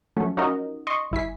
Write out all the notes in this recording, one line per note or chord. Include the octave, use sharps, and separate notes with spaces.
F3 F#3 A3 C#4
C#4 D#4 F4 F#4 A#4 D#5
D#5 C6 C#6
G1 E4 G#5 B6